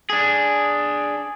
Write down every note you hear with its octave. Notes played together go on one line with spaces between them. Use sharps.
D4 G#4